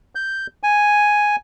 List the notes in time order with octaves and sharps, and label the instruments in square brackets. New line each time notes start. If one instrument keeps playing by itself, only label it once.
[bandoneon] G6
G#5